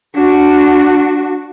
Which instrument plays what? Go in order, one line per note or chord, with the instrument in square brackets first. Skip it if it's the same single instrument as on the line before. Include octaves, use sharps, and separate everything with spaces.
[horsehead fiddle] D4 F#4